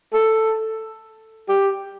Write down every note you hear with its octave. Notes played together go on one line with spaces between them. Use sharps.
A4
G4